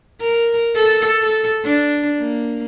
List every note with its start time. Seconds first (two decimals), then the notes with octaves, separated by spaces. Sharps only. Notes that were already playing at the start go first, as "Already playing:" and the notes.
0.21 A#4
0.75 A4
1.22 A4
1.64 D4
2.19 A#3